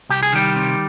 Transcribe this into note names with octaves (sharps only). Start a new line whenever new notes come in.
C2 G4
G#4
D#3 G3 G4
C3